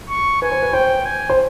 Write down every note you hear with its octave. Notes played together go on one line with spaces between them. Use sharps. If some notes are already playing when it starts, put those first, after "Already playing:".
C#6
B4 G#5
C5
B4
C5 G5
G#5
C5